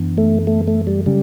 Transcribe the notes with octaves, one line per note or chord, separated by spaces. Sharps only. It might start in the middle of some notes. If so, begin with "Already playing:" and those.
Already playing: F#2 E3 B3 D4
A3
A3
A3
G3
C#3 F#3 G3 C#4